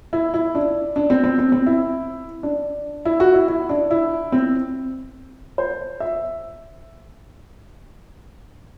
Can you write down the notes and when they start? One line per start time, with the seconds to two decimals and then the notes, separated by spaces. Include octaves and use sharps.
0.13 E4
0.34 E4
0.55 D4
0.96 D4
1.10 C4
1.24 C4
1.39 C4
1.52 C4
1.66 E4
2.43 D4
3.05 E4
3.20 F#4
3.34 E4
3.48 E4
3.69 D4
3.91 E4
4.32 C4
5.58 C5
6.00 E5